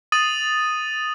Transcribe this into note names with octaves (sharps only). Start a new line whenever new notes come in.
D#6 A6 D#7 F#7